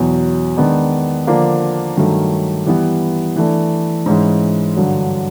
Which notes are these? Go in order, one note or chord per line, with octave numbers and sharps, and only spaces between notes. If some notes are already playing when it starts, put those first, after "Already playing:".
Already playing: E2 B2 F#3
D#3 G#3 B3 D4
D3 F3 A#3 D4
G2 D#3 F#3 A3
E3 G3 B3
E3 A3 D4
G#2 E3 G#3 C#4
G2 D3 F#3